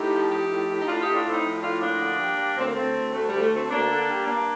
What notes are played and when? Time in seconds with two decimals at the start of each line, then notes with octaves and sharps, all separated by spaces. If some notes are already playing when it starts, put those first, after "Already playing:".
Already playing: A2 D#4 G4
0.11 F3
0.30 F3 D#4 G4
0.49 A2
0.67 A2
0.80 D#4
0.87 A2 D4 F4
1.01 A2 D#4 G4
1.15 D4 F4
1.24 A2 C4 D#4
1.44 F3
1.62 A2 D4 F4
1.81 F3 A#3 D4
2.00 D3
2.19 G3
2.38 G3
2.57 D2 C4
2.66 A#3
2.74 D2 A3 C4
2.95 D2
3.13 D2 A3
3.28 D2 G3
3.42 A3
3.51 D2
3.56 A3 C4
3.70 D2 A#3 D4
3.89 D3
4.08 G3
4.27 G2 A#3 D4